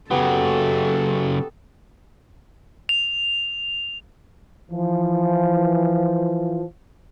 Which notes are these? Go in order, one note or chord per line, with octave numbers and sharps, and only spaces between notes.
C#3 F#3 B3 G4 A4
F7
E3 F3